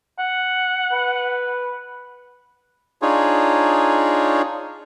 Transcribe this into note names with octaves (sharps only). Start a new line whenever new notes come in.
F#5
B4
D4 D#4 F4 G#4 C#5